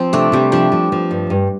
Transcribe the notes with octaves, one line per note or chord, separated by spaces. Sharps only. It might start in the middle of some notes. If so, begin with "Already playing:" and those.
Already playing: F3 C4
C3 A3 D4
C3 G3
F3 D4 G4
F3
F3
G2
G2